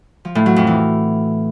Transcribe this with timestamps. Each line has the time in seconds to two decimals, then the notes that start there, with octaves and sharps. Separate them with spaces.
0.25 F3
0.35 A2
0.46 F#3
0.56 F2
0.67 E3